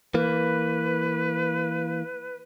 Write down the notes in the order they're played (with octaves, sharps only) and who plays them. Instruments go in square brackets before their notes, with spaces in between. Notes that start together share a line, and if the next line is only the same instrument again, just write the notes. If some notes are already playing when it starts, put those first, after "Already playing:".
[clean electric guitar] E3 A#3 [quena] B4